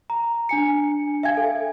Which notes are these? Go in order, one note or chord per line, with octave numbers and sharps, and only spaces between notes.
A#5
D4 G#5 C#7
E5 F5 G5 G#5 G#6
A4